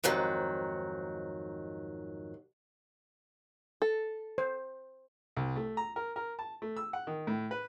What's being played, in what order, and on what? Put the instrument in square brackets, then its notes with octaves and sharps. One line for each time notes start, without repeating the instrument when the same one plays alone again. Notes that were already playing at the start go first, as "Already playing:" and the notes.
[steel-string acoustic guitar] F2 G#2 D#3 F#3
[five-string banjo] A4
[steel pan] C5
[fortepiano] C2
A3
A#5
A#4
A#4
A5
A3
E6
F#5
D#3
A2
B4